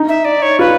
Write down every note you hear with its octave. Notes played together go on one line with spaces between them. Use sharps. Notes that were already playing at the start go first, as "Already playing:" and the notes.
Already playing: D#4
E5
D5
C#5
F4 B4